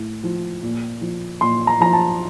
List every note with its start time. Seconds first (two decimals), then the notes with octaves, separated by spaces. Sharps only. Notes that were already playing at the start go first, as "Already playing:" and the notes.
Already playing: A2
0.24 F3
0.63 A#2
1.01 F3
1.41 A#2 C6
1.67 A#5
1.81 F3 A#5
1.93 A5